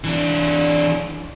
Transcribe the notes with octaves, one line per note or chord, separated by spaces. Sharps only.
E3 D4